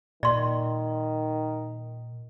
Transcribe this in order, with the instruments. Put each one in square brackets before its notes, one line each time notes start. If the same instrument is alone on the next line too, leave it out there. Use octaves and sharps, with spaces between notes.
[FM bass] A#2 [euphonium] D#3 [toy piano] D5 C6